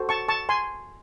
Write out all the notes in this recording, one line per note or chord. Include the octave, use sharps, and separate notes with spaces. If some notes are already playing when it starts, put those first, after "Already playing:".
Already playing: F#4 A4 C5
A5 C#6
A5 C#6
G#5 C6